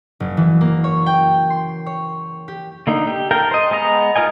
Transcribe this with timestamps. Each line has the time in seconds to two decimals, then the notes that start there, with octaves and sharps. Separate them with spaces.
0.20 F#1
0.37 E3
0.61 A#3
0.84 C#5
1.06 G5
1.50 C6
1.86 C#5
2.48 G4
2.87 D3 A#3 D#4
3.07 G4
3.31 A4 A#4 F5 G5
3.51 C5 D#5
3.71 G#3 B3 D#5 A#5
4.16 D#4 F4 A#4 D#5 G#5